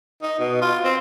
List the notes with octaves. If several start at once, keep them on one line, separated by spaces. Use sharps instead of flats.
D#4
B2
F4
C4